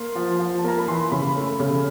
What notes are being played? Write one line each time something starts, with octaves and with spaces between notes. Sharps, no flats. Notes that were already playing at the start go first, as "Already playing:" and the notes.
Already playing: A#3 C6
F3
F3
A5
A#3 A#5
B5
E3 C6
C#3 B5
A3
C#3